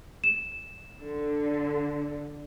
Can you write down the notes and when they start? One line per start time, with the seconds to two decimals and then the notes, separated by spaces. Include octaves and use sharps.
0.24 E7
0.98 D3